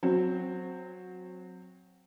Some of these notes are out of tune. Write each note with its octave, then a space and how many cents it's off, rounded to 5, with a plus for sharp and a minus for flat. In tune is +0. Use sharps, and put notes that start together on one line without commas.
F#3 -15 C4 +0